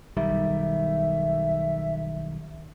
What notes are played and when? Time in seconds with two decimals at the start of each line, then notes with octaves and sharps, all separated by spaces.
0.17 B1 D#3 G3 E5